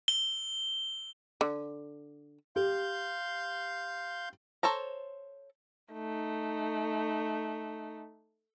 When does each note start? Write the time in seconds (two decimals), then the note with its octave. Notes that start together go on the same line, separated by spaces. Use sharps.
0.08 G7
1.41 D3
2.56 G4 F5 C6 G6
4.63 A4 C5 C#5 A#5
5.93 A3 D#4